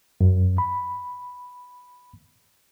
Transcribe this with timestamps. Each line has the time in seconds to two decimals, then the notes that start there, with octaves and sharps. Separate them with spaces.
0.21 F#2
0.58 B5